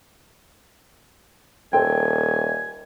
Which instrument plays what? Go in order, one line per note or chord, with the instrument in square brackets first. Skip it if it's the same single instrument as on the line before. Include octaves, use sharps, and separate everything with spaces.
[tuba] D#1 [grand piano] A4 C5 G5 [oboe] G#5